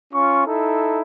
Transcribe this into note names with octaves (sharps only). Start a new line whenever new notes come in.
C#4 F4 C#6
D#4 E4 A4